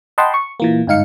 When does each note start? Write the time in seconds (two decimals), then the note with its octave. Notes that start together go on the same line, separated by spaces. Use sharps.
0.18 D#5 F#5 G5 A5 B5 C6
0.34 C#6
0.60 A#2 E3 A#3
0.87 G1 G#2 D#4 F5 C#7